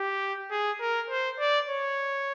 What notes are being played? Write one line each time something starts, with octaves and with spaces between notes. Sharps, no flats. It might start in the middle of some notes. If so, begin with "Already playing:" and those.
Already playing: G4
G#4
A#4
C5
D5
C#5